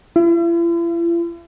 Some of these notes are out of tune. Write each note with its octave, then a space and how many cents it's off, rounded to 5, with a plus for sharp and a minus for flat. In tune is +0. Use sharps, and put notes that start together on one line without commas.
E4 +45